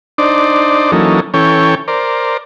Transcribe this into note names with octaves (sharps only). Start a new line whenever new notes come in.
D4 D#4 C5 D5
E3 F#3 A#3 C#4 D#4 A4
E3 C#4 A4 C#5 G5
A#4 C5 D5